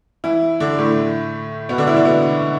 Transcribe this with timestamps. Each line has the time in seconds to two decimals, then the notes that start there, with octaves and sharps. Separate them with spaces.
0.24 E3 E4
0.60 D3 D4
0.78 A2 A3
1.69 B2 B3
1.78 D3 D4
1.87 E3 E4
1.96 D3 D4
2.05 B2 B3